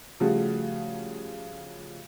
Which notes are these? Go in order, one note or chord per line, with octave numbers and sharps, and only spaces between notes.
C#3 F3 G3 A3 F#4